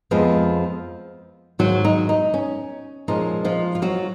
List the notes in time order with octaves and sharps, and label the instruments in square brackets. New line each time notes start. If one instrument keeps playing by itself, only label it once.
[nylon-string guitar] F2 F3 G#3 B3
G#2 D#3 F#3 A#3 F#4
D#4
D#4
C#4
A#2 F3 G#3 C#4 D#4
F3 F4
F4
F#3 F#4